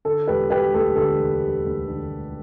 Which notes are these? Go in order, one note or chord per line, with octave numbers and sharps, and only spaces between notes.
D3 A4
E1 G4 B4
G3 G4 B4
D2 A4
D3 A4
E1
G3
D2
D3
E1